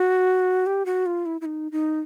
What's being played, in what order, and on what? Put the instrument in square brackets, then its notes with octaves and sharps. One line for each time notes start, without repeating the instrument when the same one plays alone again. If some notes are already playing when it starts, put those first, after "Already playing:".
Already playing: [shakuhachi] F#4
G4
F#4
F4
E4
E4
D#4
D#4